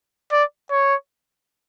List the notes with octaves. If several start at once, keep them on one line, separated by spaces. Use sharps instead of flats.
D5
C#5